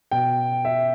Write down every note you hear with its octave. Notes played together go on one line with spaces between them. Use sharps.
B2 G5
E5